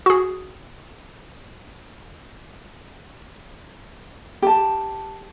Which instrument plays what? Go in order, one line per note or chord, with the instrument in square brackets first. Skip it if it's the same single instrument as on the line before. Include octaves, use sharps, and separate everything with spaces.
[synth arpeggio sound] F#4 G#4
[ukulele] G4 A5